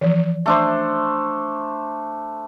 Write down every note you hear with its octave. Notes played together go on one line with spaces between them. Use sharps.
E3 F3
A3 D4 C5